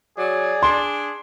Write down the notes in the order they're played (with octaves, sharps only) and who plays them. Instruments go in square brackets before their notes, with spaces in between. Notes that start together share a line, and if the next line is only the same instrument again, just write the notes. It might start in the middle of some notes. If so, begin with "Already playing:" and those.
[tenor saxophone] F#3 [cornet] G#4 [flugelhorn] D5
[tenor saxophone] D4 [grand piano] C6